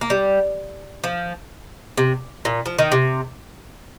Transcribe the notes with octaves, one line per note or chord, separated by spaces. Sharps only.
A#3
G3
F3
C3
A#2
F3
D#3
C3